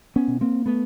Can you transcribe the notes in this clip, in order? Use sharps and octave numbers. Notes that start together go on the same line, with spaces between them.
B3 C#4
B2
A#3 C4
A3 B3